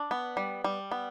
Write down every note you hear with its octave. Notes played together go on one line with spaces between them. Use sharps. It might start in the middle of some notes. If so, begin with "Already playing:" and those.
Already playing: D4
B3
G3
G3
B3